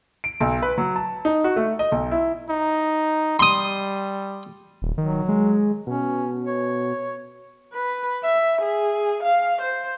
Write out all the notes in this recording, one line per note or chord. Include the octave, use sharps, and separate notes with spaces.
D7
B1
B4
F#3
A5
D#4
F#4
A3
D#5
B1
E4
D#4
G3 C6 D#6
D#1
D#3 F#3
G#3
B2 C#4
C#5
B4
E5
G#4
F5
C5